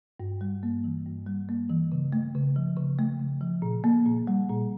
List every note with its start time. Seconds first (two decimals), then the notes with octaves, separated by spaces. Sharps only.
0.20 G2
0.41 G3
0.63 A#3
0.84 E3
1.06 G2
1.26 G3
1.49 A#3
1.70 E3
1.92 C#3
2.13 A3
2.35 C#3
2.56 F3
2.77 C#3
2.99 A3
3.19 C#3
3.41 F3
3.62 A#2
3.84 A#3
4.06 A#2
4.27 G3
4.49 A#2